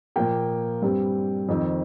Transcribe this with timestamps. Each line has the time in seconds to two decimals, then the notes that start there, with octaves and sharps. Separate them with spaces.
0.16 A#2 F3 A#3 G5
0.82 G2 G3 C4
1.49 F2 D#3 C4